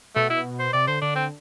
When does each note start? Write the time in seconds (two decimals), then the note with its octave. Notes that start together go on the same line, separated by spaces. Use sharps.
0.16 B2 A3
0.30 E4
0.60 C5
0.73 C3 D5
0.88 D3 C5
1.02 D3 D4
1.16 C4